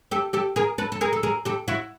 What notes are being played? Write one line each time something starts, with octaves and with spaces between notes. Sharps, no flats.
G4 A4
G4 A4
G#4 A#4
A4 B4
A4
G#4 A#4
A4
G#4 A#4
G4 A4
E4 F#4